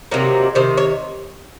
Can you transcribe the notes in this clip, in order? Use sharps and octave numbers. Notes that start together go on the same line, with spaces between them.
C3 D#3 F#3 A#3
C3 D#3 C5
C#5